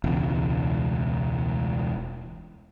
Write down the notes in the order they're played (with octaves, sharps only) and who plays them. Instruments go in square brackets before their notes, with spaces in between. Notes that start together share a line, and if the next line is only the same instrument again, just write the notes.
[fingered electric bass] E1 C#2